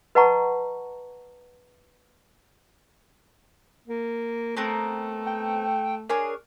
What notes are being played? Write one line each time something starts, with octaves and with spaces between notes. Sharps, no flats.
B4 D#5 F#5 A5 A#5 C#6
A#3
A3 B3 C4 A#4
G5
D4 G#4 A#4 C#5